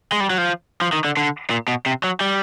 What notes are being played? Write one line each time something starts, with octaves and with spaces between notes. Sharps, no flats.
G#3
G3
F#3
F3
F3
D#3
D3
D3
A#2
B2
C3
F#3
G3